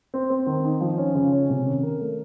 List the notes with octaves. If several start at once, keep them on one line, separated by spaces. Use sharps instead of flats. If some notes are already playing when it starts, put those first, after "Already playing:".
C4
C4
D#3
D#4
F3
C#4
C#3
C#4
C3
D#3
A#4
A3